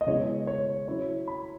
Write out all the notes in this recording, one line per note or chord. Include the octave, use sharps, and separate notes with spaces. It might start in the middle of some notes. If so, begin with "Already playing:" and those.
D#5
C#3 G#3 B3 E4 C#5
C#5
F#3 C#4 E4 C#5
B5